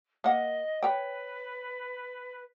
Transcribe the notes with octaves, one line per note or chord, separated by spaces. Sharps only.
A#3 D#5 F#5
B4 C#5 G5